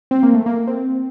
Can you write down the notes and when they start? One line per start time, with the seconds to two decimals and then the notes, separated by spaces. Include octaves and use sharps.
0.11 C4
0.23 A#3
0.34 A3
0.46 A#3
0.67 C4